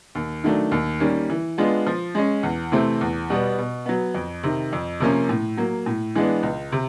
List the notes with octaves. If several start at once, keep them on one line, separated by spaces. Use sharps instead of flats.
D#2
D#3 F#3 A3 D4
D#2
D#3 G3 A#3 C#4
E3
G#3 B3 D4 F4
F3
G#3 C#4
E2
C3 E3 A3 C4
E2
B2 G3 B3
B2
F#3 B3
F2
C3 D#3
F2
C3 F3 A#3 C#4
A2
F#3 A#3
A2
E3 G#3 B3 D4
C#2
C3